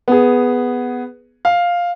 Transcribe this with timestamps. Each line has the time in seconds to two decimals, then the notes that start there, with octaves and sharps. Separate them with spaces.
0.08 B3 G#4
1.45 F5